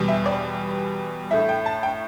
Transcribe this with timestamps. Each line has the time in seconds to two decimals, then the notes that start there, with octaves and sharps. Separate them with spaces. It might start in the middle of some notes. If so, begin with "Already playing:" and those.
Already playing: E2 B2 G3
0.08 E5
0.26 D5
1.31 A2 A3 E4 E5
1.49 G5
1.66 A5
1.83 G5